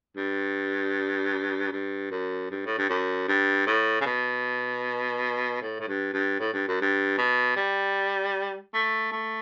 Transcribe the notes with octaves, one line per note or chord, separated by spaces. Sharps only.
G2
G2
F#2
G2
A2
G2
F#2
G2
A2
C#3
B2
A2
A2
G2
G2
A2
G2
F#2
G2
B2
G3
A3
A3